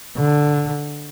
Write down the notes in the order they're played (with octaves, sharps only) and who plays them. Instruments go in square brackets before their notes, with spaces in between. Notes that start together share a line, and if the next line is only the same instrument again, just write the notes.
[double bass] D3